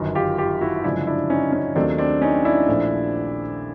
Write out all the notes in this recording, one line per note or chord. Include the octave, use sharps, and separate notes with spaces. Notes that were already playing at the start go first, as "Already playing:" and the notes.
Already playing: G1 F#2 D#3
F4 G4
F4 G4
E4 F#4
G1 F#2 C#3 F3 G#3 D4 E4
D4 E4
C#4 D#4
C#4
D#2 D#3 F#3 A3 C4 D4
C4 D4
C#4 D#4
D4 E4
A#1 A#2 F3 A3